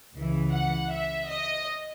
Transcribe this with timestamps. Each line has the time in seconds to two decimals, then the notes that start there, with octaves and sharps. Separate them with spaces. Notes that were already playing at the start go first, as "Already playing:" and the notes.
0.15 C#2 C#3 E3
0.53 F#5
0.91 E5
1.29 D#5